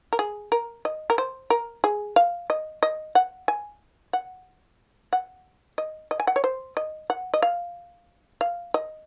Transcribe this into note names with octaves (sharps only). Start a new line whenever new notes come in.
A#4
G#4
A#4
D#5
A#4
C5
A#4
G#4
F5
D#5
D#5
F#5
G#5
F#5
F#5
D#5
D#5
G#5
F#5
C#5
C5
D#5
F#5
D#5
F5
F5
D#5